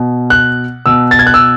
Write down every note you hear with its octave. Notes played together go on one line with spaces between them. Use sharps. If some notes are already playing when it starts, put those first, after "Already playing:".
Already playing: B2
F#6
B2 E6
A6
G#6
F#6
E6